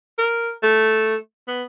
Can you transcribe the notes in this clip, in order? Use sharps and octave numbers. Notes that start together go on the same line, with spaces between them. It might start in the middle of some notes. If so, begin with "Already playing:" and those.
A#4
A3
B3